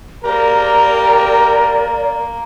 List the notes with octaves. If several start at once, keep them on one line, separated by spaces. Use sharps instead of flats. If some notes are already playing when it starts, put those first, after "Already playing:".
A#3 G4 A#4 D5 A#5